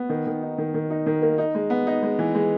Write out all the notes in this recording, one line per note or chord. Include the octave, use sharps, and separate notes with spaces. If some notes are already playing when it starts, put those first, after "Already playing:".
Already playing: B3
D#3
D#3
D#4
D#3
D#3
D#4
D#3
A#3
D#4
G#3
B3
D#4
G#3
E3
G#3